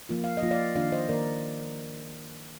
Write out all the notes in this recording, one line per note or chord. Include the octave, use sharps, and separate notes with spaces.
F3 A#3 F4
F5
D#5
F3 A#3 F4
D5 F5
D#3 A#3 D4 F4 D5 F5
C5 D#5
D#3 A#3 D4 F4 A#4 D5